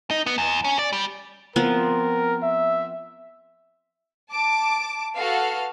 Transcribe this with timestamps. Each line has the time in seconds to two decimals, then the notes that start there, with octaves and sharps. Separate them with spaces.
0.11 D#4
0.26 B3
0.38 E2
0.64 C#4
0.79 D5
0.93 G3
1.56 F3 B3 C4 A#4
2.43 E5
4.31 A5 D6
5.15 F#4 A4 B4 F5